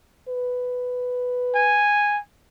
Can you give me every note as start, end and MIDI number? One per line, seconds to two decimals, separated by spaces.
0.29 1.85 71
1.55 2.20 80